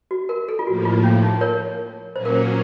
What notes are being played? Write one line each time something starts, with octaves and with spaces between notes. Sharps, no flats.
F#4
A#4
A4
F4
A2 F3 A#3 F#4
F4
C#4
D#4
A#4 C#5
A#2 F#3 A#3 C#4 C5
A#4
C5